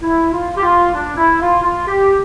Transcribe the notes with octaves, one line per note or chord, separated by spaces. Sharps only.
E4
F4
G4
F4
D4
E4
F4
F4
G4